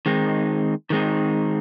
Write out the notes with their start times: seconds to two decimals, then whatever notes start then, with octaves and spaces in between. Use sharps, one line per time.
0.06 D#3 G#3 C4 D#4
0.90 D#3 G#3 C4 D#4